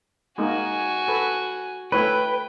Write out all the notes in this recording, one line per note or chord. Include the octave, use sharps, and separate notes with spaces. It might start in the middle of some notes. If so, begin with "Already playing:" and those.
G#3 A#3 D#4 F#4 G#5
A4 B4
A3 E4 B4 C#5 G5